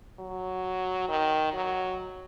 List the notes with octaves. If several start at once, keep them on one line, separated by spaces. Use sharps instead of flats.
F#3
D#3
F#3